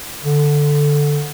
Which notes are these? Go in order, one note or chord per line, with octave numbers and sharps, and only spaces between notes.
D3